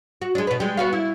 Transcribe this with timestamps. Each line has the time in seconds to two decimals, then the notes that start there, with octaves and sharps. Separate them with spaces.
0.21 F#4
0.35 G#3 D4
0.47 B2 B4
0.60 G3 G#3
0.77 B3 F#4 F5
0.93 E4